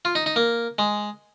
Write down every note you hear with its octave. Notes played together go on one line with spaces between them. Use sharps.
F4
D#4
D#4
A#3
G#3